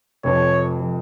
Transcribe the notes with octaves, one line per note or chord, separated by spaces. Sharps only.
F1 F2 F3 C#5
F3